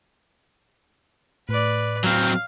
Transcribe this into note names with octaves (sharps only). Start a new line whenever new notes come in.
A2 B4 D5
F#3 C4 F5